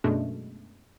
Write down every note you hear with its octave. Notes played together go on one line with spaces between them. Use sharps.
F#2 B2 G#3 A3 D4